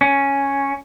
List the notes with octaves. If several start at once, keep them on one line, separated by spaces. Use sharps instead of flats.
C#4